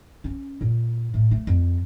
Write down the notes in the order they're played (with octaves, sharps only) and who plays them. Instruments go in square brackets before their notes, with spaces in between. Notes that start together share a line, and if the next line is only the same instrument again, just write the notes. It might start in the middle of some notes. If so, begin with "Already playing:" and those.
[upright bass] C#4
A#2
A2
A3
F2